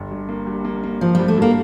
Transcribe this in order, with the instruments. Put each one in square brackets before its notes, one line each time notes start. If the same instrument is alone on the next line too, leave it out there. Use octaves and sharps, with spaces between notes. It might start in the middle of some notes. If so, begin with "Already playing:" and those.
Already playing: [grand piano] G1
G2
A#3
G2
A#3
A#3
[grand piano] G2 [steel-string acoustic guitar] F3
[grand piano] G2 [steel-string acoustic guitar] G3
[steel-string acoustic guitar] A3
[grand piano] G2 [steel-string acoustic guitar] A#3